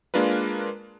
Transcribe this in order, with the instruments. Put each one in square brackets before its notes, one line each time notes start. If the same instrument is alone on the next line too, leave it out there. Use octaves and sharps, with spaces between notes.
[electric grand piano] G#3 A#3 D4 F4 A#4 B4